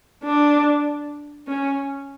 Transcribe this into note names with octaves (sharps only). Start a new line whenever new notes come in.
D4
C#4